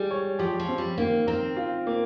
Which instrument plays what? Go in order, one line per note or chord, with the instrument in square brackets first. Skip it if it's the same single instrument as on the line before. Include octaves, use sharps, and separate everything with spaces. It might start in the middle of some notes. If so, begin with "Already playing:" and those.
Already playing: [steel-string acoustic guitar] G3 [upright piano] G#3
[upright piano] C#5
[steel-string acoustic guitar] F3 [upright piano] G4
[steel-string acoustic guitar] F3
[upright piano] C4
[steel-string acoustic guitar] G3
[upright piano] D#3 [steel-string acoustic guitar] A#3
[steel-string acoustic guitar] C4 [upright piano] A#4
[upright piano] F4
A#3